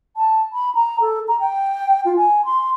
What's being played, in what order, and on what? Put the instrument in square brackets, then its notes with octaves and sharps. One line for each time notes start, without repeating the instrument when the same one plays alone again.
[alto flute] A5
B5
A#5
A4
A#5
G5
F4
G#5
C6